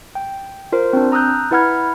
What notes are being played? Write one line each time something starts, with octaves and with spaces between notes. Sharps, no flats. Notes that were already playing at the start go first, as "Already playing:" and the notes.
G5
F4 A#4 C5
C4 D4
A#5 D#6 E6 F#6 G6
E4 B4 F#5 B5 F6 G#6